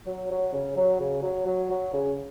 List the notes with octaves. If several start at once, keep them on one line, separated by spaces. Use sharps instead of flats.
F#3
F#3
C#3
F#3
C#3
F#3
F#3
F#3
C#3